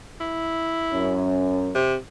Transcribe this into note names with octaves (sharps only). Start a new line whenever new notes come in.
E4
F#2 C#4
C3